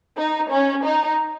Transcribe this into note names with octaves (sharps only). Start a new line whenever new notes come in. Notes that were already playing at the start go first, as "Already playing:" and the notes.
D#4
C#4
D#4